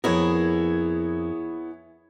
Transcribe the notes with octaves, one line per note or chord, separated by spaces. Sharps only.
F2 B3 E4 G#4 A#4 C#5 G#6